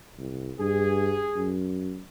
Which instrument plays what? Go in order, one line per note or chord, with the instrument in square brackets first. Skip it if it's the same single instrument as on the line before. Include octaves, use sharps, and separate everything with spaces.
[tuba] C2
[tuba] G2 [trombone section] G#4
[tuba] F#2